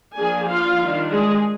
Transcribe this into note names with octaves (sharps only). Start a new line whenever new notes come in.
F3 A#3 D4 G#4 G#5
F4 F5
D#3 G3 D4
G#3 G#4